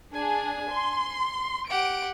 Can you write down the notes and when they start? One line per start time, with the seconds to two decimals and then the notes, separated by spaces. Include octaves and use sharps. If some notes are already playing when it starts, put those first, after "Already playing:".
0.14 D4 G#4 G#5
0.71 C6
1.70 G4 F#5 D7